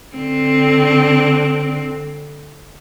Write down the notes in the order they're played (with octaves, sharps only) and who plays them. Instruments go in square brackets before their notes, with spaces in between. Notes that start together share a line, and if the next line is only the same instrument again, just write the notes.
[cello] D3 C4